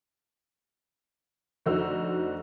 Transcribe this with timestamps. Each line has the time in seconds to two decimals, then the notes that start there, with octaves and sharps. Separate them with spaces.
1.66 F1 D3 D#4 F#4 C5 E6